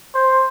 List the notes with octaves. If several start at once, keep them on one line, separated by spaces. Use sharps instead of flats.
C5